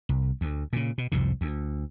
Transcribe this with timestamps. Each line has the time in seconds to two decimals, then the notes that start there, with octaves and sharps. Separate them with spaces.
0.09 C2
0.41 D2
0.73 A#2 C#3
0.98 B2
1.12 C2 F2 G#2 C3
1.41 D2